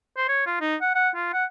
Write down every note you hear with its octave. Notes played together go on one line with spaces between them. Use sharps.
C5
C#5
F4
D#4
F#5
F#5
F4
F#5